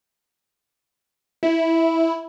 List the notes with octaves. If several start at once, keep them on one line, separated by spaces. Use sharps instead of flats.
E4